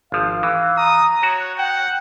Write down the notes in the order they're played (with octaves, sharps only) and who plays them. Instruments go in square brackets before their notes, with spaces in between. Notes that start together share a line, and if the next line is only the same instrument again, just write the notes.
[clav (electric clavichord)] G#1 F3 [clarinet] F5
[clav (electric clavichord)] E3
[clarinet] A#5 [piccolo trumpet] D#6
[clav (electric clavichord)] F#4 [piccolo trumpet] C#5
[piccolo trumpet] F#5 [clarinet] G5